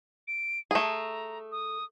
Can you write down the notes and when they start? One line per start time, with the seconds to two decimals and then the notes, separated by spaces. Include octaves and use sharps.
0.27 D7
0.71 A3 G#4 A#5
1.52 D#6